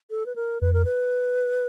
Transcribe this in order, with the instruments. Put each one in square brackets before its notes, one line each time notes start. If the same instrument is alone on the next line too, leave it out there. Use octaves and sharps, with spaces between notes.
[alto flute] A4
B4
A#4
[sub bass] F2 [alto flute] B4
[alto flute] A#4
B4